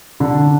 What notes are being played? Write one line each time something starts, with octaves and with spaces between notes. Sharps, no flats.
D3